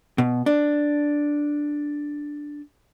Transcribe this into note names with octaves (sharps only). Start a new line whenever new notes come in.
B2
D4